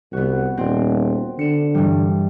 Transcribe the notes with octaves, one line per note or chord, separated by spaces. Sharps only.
C2 B3 F#4
D#1 C4
D3 C#7 E7
G2 E3 G3